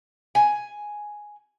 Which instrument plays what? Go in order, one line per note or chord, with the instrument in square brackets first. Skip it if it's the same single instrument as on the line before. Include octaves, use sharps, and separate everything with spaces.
[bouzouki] G#5